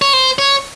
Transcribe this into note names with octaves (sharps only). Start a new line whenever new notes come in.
C#5
C5
C#5